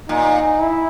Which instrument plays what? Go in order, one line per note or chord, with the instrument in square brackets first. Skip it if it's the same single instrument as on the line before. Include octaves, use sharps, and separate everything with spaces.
[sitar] A#2 [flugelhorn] D#4
[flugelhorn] E4